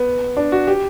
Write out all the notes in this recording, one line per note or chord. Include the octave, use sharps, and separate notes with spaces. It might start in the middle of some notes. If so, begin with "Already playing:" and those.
Already playing: B3
D4
F#4
G4